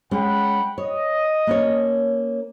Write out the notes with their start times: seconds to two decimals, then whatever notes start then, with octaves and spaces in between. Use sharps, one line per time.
0.11 G#3 C#4 F#5 G5 B5
0.78 C#5 D#5
1.47 A#3 C#4 C#5